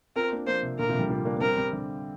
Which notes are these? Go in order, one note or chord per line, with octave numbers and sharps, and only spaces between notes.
C4 F4 A#4
A#3 D4
F3 A#3 C5
C3
A#2 D3 A#4
C3 F3
D3 G3
F3 A#3
A#3 D4
A#3
G3 C4 A#4
G3 C4
D3 G3